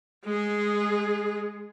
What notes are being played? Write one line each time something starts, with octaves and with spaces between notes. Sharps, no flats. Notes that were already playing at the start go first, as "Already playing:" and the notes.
G#3 G#4